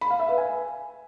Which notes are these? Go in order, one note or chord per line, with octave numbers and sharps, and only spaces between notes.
B5
F5
E5
B4
G#5